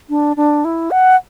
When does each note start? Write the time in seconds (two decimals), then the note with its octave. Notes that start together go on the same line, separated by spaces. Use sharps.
0.10 D4
0.37 D4
0.65 E4
0.91 F#5